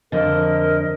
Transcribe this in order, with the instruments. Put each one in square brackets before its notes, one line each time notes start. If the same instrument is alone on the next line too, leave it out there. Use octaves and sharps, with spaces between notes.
[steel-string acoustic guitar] F2 D3 [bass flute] A#4 [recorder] D#5